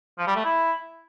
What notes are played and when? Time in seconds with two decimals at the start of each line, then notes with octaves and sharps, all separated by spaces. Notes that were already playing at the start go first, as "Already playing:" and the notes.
0.18 F3
0.27 G3
0.36 A3
0.45 E4